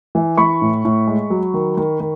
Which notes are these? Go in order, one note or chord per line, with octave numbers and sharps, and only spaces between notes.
E3
E3 B5 C#6
A2
A2
G#3
F#3
D#3
D#3
D#3